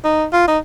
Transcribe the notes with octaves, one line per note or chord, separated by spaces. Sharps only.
D#4
F4
D#4